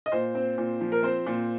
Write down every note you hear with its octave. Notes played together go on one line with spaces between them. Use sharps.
D#5
A#2 C5
C4
A#2
F3
A#4
C4 C5
A#2